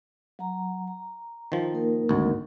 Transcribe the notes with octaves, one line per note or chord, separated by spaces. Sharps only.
F#3 F#5 A#5
A#5
D#3 F3
A#3 D#4 A#4
G#1 D2